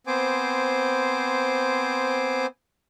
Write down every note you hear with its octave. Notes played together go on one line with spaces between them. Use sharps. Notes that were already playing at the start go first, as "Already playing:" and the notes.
B3 C4 C5 G#5 D6